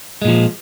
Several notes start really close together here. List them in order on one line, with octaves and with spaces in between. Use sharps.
G#3 A#2 F3